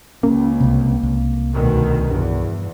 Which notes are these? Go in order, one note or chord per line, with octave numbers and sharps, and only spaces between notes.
C#2 A#3 C#4
C2 C3
C2
D2 B2 D#3
E2 G2